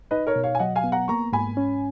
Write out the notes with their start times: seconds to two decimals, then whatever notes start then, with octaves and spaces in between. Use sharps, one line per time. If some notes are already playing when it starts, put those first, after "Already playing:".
0.11 D#4 B4 D#5
0.27 A#4 C#5
0.36 B2
0.43 C#5 F5
0.55 G#5
0.59 F#3 D#5 F#5
0.75 F5 G#5
0.84 B3
0.92 F#5 A#5
1.08 A#3 A#5 C#6
1.32 G#2 G#5 B5
1.57 C#4